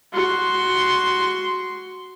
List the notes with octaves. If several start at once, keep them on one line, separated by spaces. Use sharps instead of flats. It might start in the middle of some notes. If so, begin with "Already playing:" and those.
F#4 C6